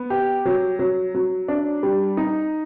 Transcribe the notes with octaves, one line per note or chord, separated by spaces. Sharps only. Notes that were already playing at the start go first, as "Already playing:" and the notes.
Already playing: B3
G4
F#3
F#3
F#3
D4
G3
D#4